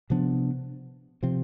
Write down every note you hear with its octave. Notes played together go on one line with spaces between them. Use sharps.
C3 F3 B3 D4
C3 F3 C4